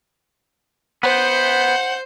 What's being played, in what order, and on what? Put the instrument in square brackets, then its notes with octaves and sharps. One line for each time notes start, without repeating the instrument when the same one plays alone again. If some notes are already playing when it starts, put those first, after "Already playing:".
[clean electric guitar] B3 [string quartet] C5 G6 [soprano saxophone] F#5